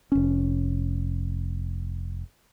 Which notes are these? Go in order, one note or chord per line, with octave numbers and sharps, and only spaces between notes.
F1 C#4